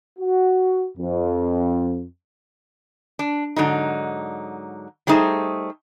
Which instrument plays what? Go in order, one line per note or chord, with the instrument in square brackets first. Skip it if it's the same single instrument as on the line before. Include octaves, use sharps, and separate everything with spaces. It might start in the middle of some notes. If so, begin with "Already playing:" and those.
[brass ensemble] F#4
F2
[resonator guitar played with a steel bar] D4
G#2 D3 F#3 D#4
F#3 G3 A3 D#4 G#4 C5